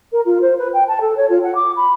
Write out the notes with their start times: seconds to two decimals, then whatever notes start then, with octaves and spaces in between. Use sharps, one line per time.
0.12 A#4
0.25 F4
0.41 C5
0.58 B4
0.73 G5
0.88 A5
1.01 A4
1.17 C#5
1.29 F4
1.43 F#5
1.55 D6
1.76 B5